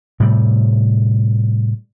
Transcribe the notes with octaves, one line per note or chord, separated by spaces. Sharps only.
A2 C3 G3